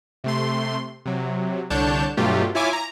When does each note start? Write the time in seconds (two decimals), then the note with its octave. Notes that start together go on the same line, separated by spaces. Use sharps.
0.24 C3 A3 C6
1.05 C3 F#3
1.70 C2 D3 D4 C#5 A5 G6
2.17 G2 B2 F#3 A3 F4 G4
2.55 E4 F4 C#5 E5 G#5 D6
2.73 A#5